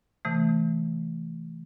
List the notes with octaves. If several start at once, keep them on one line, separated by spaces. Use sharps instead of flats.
C3 E3 A3